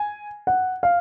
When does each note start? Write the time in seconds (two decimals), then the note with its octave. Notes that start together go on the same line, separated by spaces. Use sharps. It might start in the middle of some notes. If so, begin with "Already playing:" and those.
Already playing: G#5
0.47 F#5
0.83 F5